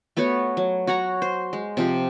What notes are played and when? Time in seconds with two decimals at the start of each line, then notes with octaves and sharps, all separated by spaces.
0.17 A3 B3 F#4 C#5
0.57 F#3
0.87 F#4 C#5 F#5 A#5
1.22 C5
1.53 G#3
1.77 C3 F3 G4